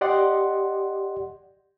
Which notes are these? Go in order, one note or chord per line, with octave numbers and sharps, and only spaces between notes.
G4 D5 D#5 F#5 C6